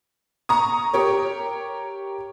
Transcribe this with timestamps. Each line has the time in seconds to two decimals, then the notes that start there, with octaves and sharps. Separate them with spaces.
0.49 A#5 C#6 D#6
0.93 G4 A#4 C#5